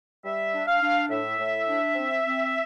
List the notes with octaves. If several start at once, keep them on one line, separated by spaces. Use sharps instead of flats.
G3 E5
D4
F5
D4
A2 E5
A2
D4
C4
C4